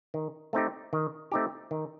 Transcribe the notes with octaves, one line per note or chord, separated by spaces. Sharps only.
D#3
A3 C4 D#4 G4
D#3
A3 C4 D#4 G4
D#3